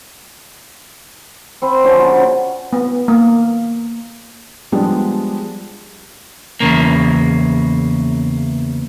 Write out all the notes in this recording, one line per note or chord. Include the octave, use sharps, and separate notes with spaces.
C4 C5 B5
D3 F3 C#4
A#3 F4 F#4
C#3
B3
A#3
F3 G3 G#3 B3 D4
E2 C#3 A#3